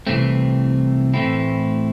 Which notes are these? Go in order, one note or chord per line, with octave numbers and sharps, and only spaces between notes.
C2 C3 E3 A3 C4
A2 E3 A3 C4 E4